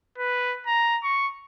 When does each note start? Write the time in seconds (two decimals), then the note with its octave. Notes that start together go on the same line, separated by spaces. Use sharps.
0.18 B4
0.67 A#5
1.03 C#6